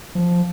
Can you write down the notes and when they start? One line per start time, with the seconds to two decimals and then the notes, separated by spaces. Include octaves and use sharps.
0.15 F3